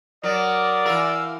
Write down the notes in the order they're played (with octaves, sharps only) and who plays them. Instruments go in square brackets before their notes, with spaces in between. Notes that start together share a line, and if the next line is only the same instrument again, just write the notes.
[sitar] F#3 [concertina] A#4 D#6 [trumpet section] D5
[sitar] E3 A#4 [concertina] F5 E6